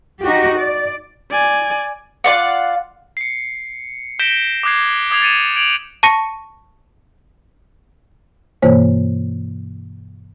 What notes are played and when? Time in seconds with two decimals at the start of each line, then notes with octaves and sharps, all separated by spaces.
0.23 D#4 F#4 G4
0.59 D5
1.31 D5 G#5
2.24 F4 D5 F#5
3.17 C7 C#7
4.19 G6 A#6 B6 D7 E7 G7
4.63 D6 D#6 F#6 G#6 C7
5.10 D6 D#6 G#6 C7 F7
5.22 A6 C#7 D#7 E7
5.56 G#6 D7 F7 F#7
6.03 A5 C#6 A#6 C#7
8.62 G2 B2 E3 A#3 C5 C#5